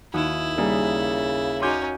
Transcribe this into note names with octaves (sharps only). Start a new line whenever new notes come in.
D#2 E4 F#4 D#6
C#3 G3 A#3 G#4
C#4 D#4 F#4 C6 D6 G6 D#7